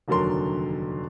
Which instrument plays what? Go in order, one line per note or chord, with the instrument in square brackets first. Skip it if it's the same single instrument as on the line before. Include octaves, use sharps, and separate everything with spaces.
[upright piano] F1 D#2 D3 F#3 A#4 C6